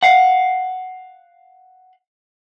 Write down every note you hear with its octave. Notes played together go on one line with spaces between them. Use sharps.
F5 F#5